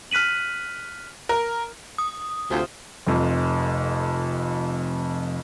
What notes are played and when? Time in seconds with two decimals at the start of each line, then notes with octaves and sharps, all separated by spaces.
0.11 F6 F#6 B6 D#7 F#7
1.29 A#4
1.98 D#6
2.50 D2 C3 F4 C5
3.07 F1 F2